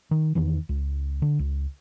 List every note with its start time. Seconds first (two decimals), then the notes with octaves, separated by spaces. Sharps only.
0.11 D#3
0.35 E2 D#3 E3
0.69 C#2
1.22 D3
1.39 C#2